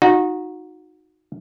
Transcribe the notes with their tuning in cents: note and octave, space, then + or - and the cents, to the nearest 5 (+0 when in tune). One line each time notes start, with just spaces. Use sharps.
D#4 +0 F#4 -25